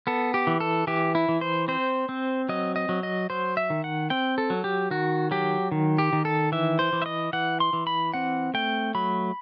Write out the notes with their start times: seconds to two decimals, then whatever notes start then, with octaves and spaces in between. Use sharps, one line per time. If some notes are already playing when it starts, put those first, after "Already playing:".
0.07 B3 A4
0.34 G4
0.47 E3
0.60 A4
0.87 E3 G4
1.15 E4
1.29 E3
1.41 C5
1.68 C4 C5
2.09 C4
2.49 F#3 D#5
2.76 D#5
2.89 F#3
3.03 D#5
3.30 F#3 C5
3.57 E5
3.70 D#3
3.84 F#5
4.10 C4 G5
4.38 A4
4.50 F#3
4.64 G4
4.91 D#3 F#4
5.31 F#3 G4
5.72 D#3
5.98 G4
6.13 D#3
6.25 A4
6.52 E3 E5
6.79 C5
6.93 E3
7.02 E5
7.06 D#5
7.33 E3 F#5
7.60 C6
7.73 E3
7.87 B5
8.14 C4 F#5
8.54 A3 G5
8.95 F#3 B5